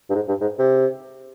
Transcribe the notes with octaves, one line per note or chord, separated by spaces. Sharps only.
G2
G#2
G2
G#2
C3